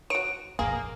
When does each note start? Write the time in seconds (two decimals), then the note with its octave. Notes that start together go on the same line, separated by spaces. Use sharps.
0.10 F#4 C#5 D7
0.59 A#1 F2 A#3 G#4